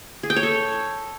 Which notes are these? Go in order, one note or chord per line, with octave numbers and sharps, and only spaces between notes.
G#4
G5
C#5
A4